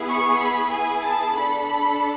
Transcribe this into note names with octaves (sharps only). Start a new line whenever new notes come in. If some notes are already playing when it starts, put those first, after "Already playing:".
Already playing: B3 E4 G#4
C#6
B5
G#5
A5
D4 A4 B5
B5